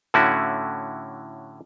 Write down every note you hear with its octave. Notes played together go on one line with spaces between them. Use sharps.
A2 D3 A3 C#4 E4 F#4